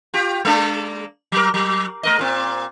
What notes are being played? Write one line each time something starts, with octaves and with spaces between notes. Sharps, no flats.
F4 G4
G#3 A#3 D4
F#3 A#4
F#3
A3 A#4 D#5
A#2 C4